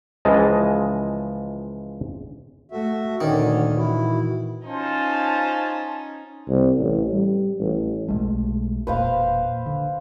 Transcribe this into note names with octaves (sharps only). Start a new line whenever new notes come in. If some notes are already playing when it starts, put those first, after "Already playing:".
C#2 E3 F3 G#3 D#5 A5
A3 F#4 E5
D2 A#2 D3 D#3 C#4 C#5 D5
E3 E4 F#4
C#4 D#4 F4 C5 A5
C2
A1
G3
A1
B1 G#3 A3
E1 A#2 B4 C5 F5
D3